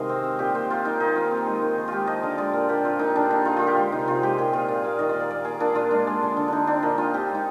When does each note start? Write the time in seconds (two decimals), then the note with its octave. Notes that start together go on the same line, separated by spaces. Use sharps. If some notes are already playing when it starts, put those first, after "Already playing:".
Already playing: C3 D#3 G#3 D#5 F5
0.09 C4
0.23 C4
0.39 A#2 G4
0.55 A#2 C5
0.70 A#3 F4
0.85 A#3 D#4
1.00 D#3 D#4
1.16 A#3 F4
1.31 C4
1.47 G#3
1.62 D#3
1.78 D#3
1.88 G#3 F4 G4
2.07 F3 D#5
2.23 D3 F5
2.38 G#3 D5
2.53 A#2 A#4
2.69 A#2 G4
2.84 C4 F4
2.99 A#2 D#4
3.16 D3 D4
3.30 A#3 D#4
3.45 D3 F4
3.57 A#3 F4
3.67 G4
3.77 G#3 F4
3.92 C3 D#4
4.08 C3 F4
4.22 G#3 G4
4.38 A#2 G#4
4.53 A#2 F4
4.68 A#2 D5
4.83 A#3 F5
4.99 D#3 D#5
5.09 A#3 D5
5.20 D5
5.30 A#3 D5
5.45 A#3 G#4
5.60 A#2 D4
5.75 A#2 F4
5.91 G#3 D4
6.07 G#3
6.22 D3
6.37 D3
6.48 D3 D4 D#4
6.67 C4 D4
6.83 A#2 D#4
6.98 A#2 F4
7.14 C4 G4
7.30 G#3 D#4